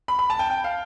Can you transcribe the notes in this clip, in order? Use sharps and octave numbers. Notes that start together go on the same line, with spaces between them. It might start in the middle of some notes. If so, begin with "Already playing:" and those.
B5
B5
A5
G5
G5
F5